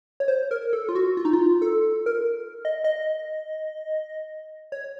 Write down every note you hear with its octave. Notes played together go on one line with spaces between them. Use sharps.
C#5
C5
A#4
A4
F4
F#4
F4
D#4
F4
A4
A#4
D#5
D#5
C#5